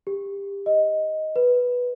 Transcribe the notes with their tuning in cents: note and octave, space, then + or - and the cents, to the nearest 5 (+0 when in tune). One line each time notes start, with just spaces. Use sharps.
G4 +25
D#5 +10
B4 -5